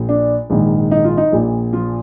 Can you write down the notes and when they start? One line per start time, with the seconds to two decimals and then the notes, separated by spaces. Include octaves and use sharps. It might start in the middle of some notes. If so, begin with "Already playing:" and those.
Already playing: A#1 A#2
0.09 D4
0.50 A#1 G#2 D#3
0.91 D#4
1.04 F4
1.17 D#4
1.32 A#1 A#2
1.73 F3 F4